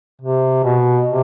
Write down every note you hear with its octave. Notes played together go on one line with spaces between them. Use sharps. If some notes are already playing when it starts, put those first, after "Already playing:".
C3
B2
C3